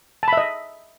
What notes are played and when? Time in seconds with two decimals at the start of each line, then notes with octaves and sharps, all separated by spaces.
0.23 A5
0.28 B5
0.33 E5
0.37 D#5